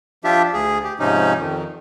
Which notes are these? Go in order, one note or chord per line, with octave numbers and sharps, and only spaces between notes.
F3 D4 F4 G4 E5
D2 G#4
G4
G#2 C3 F3 C#4 D#4
F2 D#3